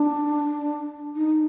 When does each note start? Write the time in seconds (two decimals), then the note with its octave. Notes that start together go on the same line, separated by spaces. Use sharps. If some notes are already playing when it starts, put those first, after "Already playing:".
Already playing: D4
1.16 D#4